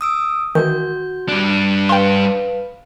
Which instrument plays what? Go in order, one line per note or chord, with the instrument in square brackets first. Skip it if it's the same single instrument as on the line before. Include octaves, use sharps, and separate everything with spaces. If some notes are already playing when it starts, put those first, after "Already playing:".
[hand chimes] D#6 E6 D7
[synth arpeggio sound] D#3 E3 [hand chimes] F#4 G6
[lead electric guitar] G2 D4
[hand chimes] B4 F5 [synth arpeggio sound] G5 C6